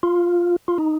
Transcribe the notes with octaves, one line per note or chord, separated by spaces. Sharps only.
F4
F4
D#4